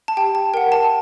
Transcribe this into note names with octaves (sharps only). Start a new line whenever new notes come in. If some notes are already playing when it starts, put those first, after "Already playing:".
A5
G4 G5
A5
A#4 F#5 G5
A5